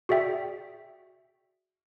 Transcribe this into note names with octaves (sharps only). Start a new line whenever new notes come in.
F#4 G#4 D5 E5 G5